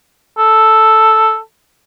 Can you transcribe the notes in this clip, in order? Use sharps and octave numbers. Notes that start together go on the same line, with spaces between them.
A4